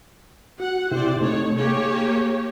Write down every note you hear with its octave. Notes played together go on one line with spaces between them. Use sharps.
F#4 F#5
C3 E4 G4 C5 D5
C3 A3 D#4 C#5
A#3 G4 G#4 C#5